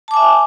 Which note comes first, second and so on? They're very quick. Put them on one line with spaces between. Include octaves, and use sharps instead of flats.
A5 D6 G#5 E5